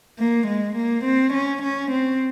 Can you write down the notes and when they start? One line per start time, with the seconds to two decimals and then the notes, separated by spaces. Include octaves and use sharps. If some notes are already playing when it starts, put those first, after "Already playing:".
0.19 A#3
0.48 G#3
0.77 A#3
1.05 C4
1.34 C#4
1.63 C#4
1.92 C4